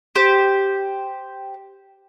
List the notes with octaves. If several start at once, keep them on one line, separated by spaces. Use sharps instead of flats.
G4 C5